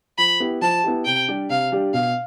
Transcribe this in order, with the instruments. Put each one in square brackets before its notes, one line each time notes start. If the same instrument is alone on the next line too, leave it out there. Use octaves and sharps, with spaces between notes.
[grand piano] F3 [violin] B5
[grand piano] B3 E4 G4
[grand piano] F3 [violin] A5
[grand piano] B3 E4 G4
[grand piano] C3 [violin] G5
[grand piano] G3 D4 G4
[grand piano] C3 [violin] F5
[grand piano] G3 D4 G4
[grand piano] B2 [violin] F5